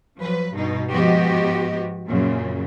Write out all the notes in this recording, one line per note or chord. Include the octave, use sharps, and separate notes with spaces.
F3 F#3 B4
G2 B2 D#4
G#2 F3 B3 F#4 G4 D#5
F#2 A#2 C#3 F#3